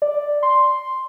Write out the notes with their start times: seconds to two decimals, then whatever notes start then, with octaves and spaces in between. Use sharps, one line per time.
0.02 D5
0.43 C6